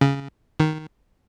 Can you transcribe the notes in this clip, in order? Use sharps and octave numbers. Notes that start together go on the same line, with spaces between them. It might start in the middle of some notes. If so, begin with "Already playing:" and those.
C#3
D#3